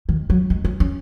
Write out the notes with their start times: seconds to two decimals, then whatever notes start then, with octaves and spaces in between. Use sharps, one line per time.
0.09 D#3
0.30 F#3
0.50 G#3
0.65 C#4
0.80 C#4